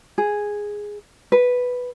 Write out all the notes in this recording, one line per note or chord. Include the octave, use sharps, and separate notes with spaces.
G#4
B4